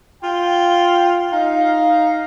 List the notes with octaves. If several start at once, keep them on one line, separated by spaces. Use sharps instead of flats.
F4 G5
D#4 F5